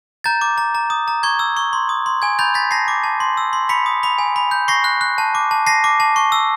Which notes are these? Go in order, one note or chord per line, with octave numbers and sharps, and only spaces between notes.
A#5 G6 A6
D6
A#5
A#5
D#6
A#5
C#6 G#6
E6
C#6
C6
D#6
C6
G#5 G#6
B5 G6 A6
G6 A6 B6
A5 A#6 C7
D6
A5
C6
E6
C6
B5 B6 C#7
D#6
B5
G#5
B5
G6
C#6 A#6 C7
F#6
F#6
A5
D6
A5
A5 A#6 C7
D6
A5
C#6
E6